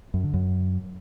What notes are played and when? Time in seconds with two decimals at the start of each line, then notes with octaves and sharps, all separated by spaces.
0.14 F#2
0.24 D3
0.34 F#2